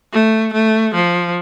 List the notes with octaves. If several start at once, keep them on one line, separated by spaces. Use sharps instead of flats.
A3
A3
F3